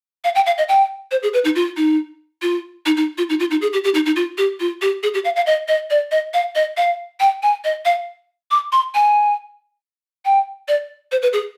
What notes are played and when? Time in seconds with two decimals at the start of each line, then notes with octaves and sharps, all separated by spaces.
0.24 F5
0.35 G5
0.46 F5
0.58 D#5
0.69 G5
1.11 C5
1.23 G#4
1.33 B4
1.45 D#4
1.55 F4
1.77 D#4
2.42 F4
2.86 D#4
2.97 D#4
3.18 F4
3.29 D#4
3.40 F4
3.51 D#4
3.62 G#4
3.73 G4
3.84 G4
3.94 D#4
4.06 D#4
4.16 F4
4.38 G4
4.60 F4
4.82 G4
5.03 G#4
5.14 G4
5.24 F5
5.36 F5
5.46 D#5
5.68 D#5
5.90 D5
6.11 D#5
6.34 F5
6.55 D#5
6.77 F5
7.20 G5
7.43 G#5
7.64 D#5
7.85 F5
8.51 D6
8.72 C6
8.95 G#5
10.25 G5
10.68 D5
11.12 C5
11.22 B4
11.33 G#4